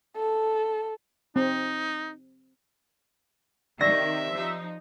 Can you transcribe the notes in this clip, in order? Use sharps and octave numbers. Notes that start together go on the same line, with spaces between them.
A4
C4 D#4
C3 D#3 D5 E5 C#6 A#6
F3 D#4